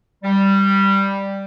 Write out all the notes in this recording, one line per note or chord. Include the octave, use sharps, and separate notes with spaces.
G3